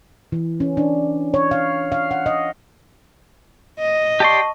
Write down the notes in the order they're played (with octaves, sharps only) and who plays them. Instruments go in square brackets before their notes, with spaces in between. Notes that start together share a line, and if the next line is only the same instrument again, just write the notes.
[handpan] E3
C#4
D4
C#5
F5
F5
F#5
D#5
[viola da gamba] D#5
[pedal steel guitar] G4 D5 C6 [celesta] A5 C#6